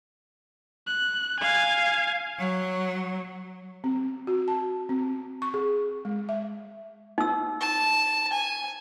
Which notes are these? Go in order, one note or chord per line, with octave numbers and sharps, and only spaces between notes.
F#6
F5 G#5
F#3
C4
F#4
A5
C4
C#6
G#4
G#3
E5
D#4 E6
A5
G#5